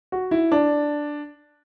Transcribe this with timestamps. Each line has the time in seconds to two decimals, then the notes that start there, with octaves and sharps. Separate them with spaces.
0.12 F#4
0.31 E4
0.52 D4